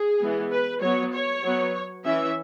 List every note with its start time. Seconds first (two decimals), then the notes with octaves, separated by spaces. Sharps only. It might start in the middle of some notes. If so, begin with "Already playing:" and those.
Already playing: G#4
0.21 E3 G#3 B3
0.51 B4
0.81 F#3 B3 C#5
1.13 C#5
1.43 F#3 B3
2.05 E3 C#4 E5